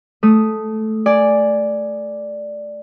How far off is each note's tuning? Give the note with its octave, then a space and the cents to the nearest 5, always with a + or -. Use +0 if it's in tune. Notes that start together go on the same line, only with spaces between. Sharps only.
A3 -10 D#6 +0
D5 +0 G#5 +0